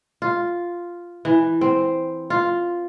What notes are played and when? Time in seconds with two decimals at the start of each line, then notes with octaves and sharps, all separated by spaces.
0.22 F4
1.25 E3
1.61 C4
2.30 F4